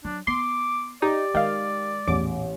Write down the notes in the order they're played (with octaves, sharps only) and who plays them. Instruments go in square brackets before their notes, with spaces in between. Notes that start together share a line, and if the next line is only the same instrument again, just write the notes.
[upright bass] F#3 [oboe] D4
[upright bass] B3 [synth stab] C6 C7 [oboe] D6
[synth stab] D#4 [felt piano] G4 [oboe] D5
[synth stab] D#3 F5 [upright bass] G#3
[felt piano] A1 [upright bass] E2 A#2 [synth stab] D6